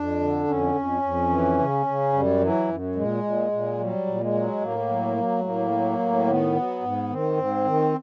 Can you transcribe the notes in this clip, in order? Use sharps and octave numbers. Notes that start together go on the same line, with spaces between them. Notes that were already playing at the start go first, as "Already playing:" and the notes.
Already playing: F2 D4
D3
F2 C#4
F2
F2
E3
C#3
C#3
F#2 G3
E3 F#3
F#2
A#2 G#3
A#2
A#2
F#3 G3
A#2
G#3
F#3
A2 A#3
F#3
F#3
A3
A2 A#3
F#3
A2
D#3 B3
F#3
G#2
D#3 C4
G#2
D#3